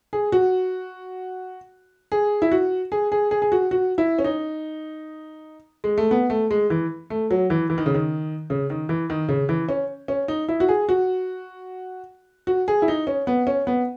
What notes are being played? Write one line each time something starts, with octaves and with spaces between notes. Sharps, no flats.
G#4
F#4
G#4
E4
F#4
G#4
G#4
G#4
G#4
F#4
F#4
E4
C#4
D#4
G#3
A3
B3
A3
G#3
E3
A3
F#3
E3
E3
D#3
C#3
D#3
C#3
D#3
E3
D#3
C#3
E3
C#4
C#4
D#4
E4
F#4
G#4
F#4
F#4
G#4
E4
D#4
C#4
B3
C#4
B3